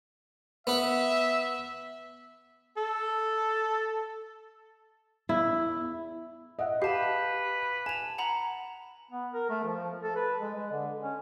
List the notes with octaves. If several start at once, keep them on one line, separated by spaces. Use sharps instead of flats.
B3 B4 E5
A4
E2 E4
D#5 E5 F#5
G4 B4 F5 A5
G#5 A5 F7
F#5 A#5 B5
B3
A#4
A3
F3
A4
B4
G#3
G#3
D3
C#4